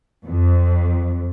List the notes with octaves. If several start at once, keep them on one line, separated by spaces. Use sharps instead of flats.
F2